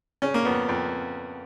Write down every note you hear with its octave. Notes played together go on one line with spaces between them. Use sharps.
C#3 C#4
A#3
F2 B3
F2